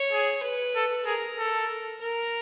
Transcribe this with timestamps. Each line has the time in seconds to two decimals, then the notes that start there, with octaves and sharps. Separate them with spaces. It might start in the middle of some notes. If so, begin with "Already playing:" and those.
Already playing: C#5
0.12 G#4
0.43 B4
0.75 A4
1.06 G#4 A#4
1.38 A4
2.01 A#4